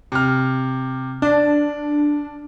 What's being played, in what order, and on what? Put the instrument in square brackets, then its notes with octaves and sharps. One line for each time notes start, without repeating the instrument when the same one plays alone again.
[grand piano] C3 F6
[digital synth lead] D4 [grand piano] D5